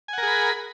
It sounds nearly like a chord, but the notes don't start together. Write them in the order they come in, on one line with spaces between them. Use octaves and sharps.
G#5 F#5 A#4 G#4 B5